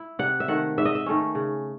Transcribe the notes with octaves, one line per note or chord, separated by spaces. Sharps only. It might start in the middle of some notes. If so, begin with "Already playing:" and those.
Already playing: E4
C3 F#5
E5
D#3 A3 F#5
G#2 E5
D#5
E5
D#3 A3 C#4
C#3